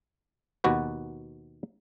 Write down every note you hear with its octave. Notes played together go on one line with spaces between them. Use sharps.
D#2 B2 F#4 B4